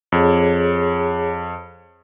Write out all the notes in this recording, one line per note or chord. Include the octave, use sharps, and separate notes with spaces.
F2 G#4 C#5